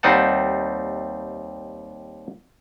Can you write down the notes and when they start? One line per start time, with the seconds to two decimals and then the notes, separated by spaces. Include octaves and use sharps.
0.03 D#2 G3 C4 D#4 F#5 A5